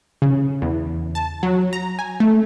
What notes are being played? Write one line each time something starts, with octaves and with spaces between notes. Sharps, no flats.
C#3
E2
A5
F#3
A#5
G#5
A3